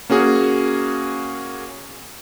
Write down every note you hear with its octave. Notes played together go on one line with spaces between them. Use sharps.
A#3 C#4 F#4 G#4